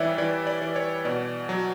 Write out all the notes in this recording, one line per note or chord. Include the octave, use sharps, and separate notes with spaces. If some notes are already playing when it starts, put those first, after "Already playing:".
Already playing: E3 G3 B4 C#5 D5 E5
E3 D5
D5
E3
C#5
B2 D5
F#3